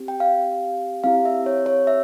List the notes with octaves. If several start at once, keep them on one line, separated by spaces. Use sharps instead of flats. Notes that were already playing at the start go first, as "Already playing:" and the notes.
Already playing: C4 G4
G5
F5
C4 E4 G4 F5
E5
C#5
C#5
E5